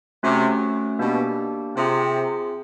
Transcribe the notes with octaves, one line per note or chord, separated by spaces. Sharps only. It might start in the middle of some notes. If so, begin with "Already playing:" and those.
C3 A3 C#4 F#4
B2 A#3 D4 G4
C3 C4 F4 G#4